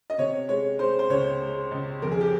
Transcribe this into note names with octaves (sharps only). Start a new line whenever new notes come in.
D#5
C3 C#5
G#3 C#5
G#3 C5
C5
C#2 C#5
G#3
C#2
F2 A#4
G#4
G4